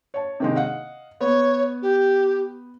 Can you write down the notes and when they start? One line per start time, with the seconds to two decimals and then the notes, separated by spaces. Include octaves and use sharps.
0.14 C#5 A5
0.40 C3 D#3 G#3
0.55 D#5 F5 F#5
1.21 B3 C#5
1.82 G4